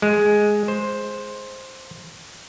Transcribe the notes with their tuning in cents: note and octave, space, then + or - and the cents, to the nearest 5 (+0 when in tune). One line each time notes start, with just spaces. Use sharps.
G#3 +5
C5 +10